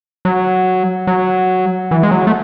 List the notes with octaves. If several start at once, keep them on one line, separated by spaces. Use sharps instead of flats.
F#3
F#3
E3
G#3
F#3
A3